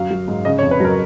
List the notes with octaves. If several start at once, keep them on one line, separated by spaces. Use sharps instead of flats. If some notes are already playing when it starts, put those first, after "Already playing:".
Already playing: F#2 F#3 F5
F#3
G#2
C#3 D#5
C#5
F2
B4
F#3 A#4